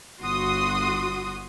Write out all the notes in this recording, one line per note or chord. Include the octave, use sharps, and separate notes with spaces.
G1 F#4 C6 D#6